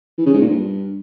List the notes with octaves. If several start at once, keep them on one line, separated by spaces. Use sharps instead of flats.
E3
C#3
G#2
A#2
G2